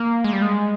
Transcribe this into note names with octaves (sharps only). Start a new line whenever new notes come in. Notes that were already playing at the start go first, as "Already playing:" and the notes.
Already playing: A#3
G#3
G3
G#3